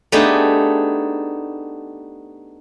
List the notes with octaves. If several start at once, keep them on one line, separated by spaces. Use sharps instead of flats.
A3 B3 D4 D#4 G4 G#4